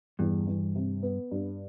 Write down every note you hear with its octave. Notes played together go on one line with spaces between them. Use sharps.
E2 G2
E3
C3
B3
G2